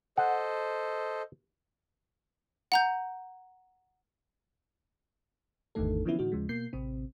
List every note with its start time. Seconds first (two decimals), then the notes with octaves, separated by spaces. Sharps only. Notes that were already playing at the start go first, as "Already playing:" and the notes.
0.17 A4 C5 D#5 F#5
2.72 F#5 A#5 G6
5.75 G#1 E2 D3 D#3 A3 A4
6.05 D3 E3 F3 B3 C#4 E4
6.19 A2 D3 E3 D#4 F#4
6.32 D#2 C#3 F3 G#3
6.49 B2 A#3 G6 C7
6.73 A1 C3 C4